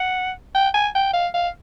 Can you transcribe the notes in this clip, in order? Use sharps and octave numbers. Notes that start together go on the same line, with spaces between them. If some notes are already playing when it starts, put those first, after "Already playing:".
Already playing: F#5
G5
G#5
G5
F5
F5